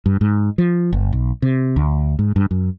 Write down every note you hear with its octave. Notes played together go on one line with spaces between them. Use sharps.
G2
G#2
F3
G1
B1
C3
D2
G#2
G2
F#2